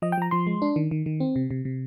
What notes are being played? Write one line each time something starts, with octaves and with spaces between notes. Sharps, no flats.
F3 D#5
G5
F3 A#5
F3 C6
G#3
D4
D#3
D#3
D#3
C4
C3
C3
C3